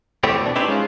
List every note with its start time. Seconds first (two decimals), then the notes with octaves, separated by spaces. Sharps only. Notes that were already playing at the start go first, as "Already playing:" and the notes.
0.24 E3 G3 A3 B3 C4 G4
0.43 B2 D4
0.55 C#4 D#4 E4 G4 B4 C5
0.68 G#3 C#4 D#4 F4